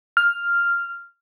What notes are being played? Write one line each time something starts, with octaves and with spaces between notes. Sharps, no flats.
F6